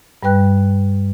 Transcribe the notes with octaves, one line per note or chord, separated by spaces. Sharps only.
G2 G3 B4 G5 F#6